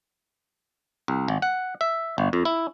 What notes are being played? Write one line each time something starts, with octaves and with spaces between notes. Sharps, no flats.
C2
G#1
F#5
E5
G1
F2
E4